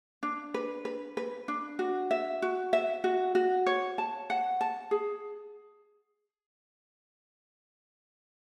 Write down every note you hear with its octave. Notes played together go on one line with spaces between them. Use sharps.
D4
B4
B4
B4
D4
F#4
E5
F#4
E5
F#4
F#4
C#5
A5
F#5
A5
G#4